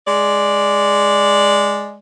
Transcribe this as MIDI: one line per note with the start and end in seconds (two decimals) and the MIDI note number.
0.08 1.99 56
0.08 1.99 74